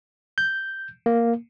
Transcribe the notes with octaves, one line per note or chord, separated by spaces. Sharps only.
G6
A#3